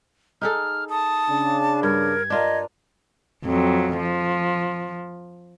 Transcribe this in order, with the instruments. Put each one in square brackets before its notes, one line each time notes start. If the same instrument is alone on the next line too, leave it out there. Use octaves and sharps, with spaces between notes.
[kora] D#4 G#4 A4 [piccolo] F6
[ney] A5 [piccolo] D#6
[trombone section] C#3 D4
[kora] G2 [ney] A#4 [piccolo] G#6
[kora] D4 F4 A#4 [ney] D#5
[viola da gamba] F2 F#3
F3